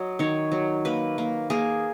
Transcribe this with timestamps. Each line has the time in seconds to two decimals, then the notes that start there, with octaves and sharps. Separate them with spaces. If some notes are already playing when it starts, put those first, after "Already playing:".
Already playing: F#3 D#5
0.19 D#3 C#5
0.52 F#3
0.85 A#3 B4
1.18 A#3
1.50 A#3 G#4